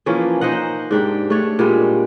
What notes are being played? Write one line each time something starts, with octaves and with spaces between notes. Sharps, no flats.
E3 F3 A#3 C#4
D#4 C5 D#5 F#5
G#2 D4 G4 G5
A3 D4 A4 C#5
A#2 G3 G#3